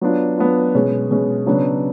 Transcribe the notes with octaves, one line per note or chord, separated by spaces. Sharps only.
F#3 B3 D4 F4
F#3 B3 D4 F4
B2 G#3 C#4
B2 G#3 C#4
C#3 F#3 B3 D4